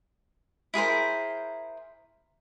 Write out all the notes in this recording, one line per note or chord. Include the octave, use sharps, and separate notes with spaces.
E4 G#4 A#4 C5